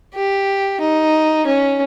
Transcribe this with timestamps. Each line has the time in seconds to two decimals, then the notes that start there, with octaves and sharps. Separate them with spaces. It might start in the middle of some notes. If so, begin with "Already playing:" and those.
0.15 G4
0.81 D#4
1.47 C#4